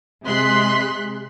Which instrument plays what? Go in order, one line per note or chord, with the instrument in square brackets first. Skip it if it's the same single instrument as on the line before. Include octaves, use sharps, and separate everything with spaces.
[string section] C3 G#3 C6 F#6 B6